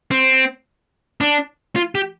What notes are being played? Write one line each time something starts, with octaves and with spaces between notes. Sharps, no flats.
C4
D4
F4
G4